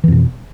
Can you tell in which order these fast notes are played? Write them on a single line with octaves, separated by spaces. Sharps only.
E3 F2 B2